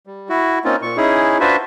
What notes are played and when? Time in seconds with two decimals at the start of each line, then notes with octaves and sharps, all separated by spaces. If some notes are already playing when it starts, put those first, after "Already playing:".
0.07 G3
0.29 E4 F#4
0.64 A#3 C4 C#4 D#4 F4
0.82 A#2 C#6
0.97 C#4 D#4 E4 G#4
1.40 D4 F4 F#4 B4 C5 E5